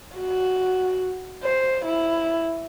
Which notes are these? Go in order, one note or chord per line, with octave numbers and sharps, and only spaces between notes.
F#4
C5
E4